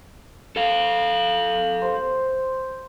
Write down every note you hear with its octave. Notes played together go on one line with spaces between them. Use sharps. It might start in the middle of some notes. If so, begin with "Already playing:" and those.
A4 F5
C5